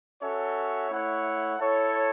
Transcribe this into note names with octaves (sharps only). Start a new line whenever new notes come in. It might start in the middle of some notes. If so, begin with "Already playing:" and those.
C#4 F#4 A4 C#5 E5
A3 E4 C#5 F#5
E4 A4 C#5